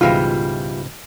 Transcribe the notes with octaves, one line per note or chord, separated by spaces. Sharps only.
C#2 G#2 B2 E3 G3 F4